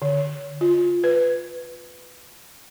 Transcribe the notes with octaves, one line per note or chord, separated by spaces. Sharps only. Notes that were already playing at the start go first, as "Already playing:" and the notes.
D3
F4
B4